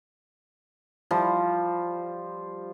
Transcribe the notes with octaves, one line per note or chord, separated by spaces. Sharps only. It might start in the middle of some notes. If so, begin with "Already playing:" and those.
F3 G3